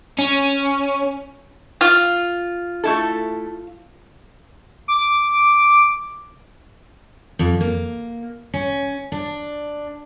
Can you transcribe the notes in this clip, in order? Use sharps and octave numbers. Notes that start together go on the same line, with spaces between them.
C#4
F4
A3 E4 A4
D6
F2
A#3
C#4
D4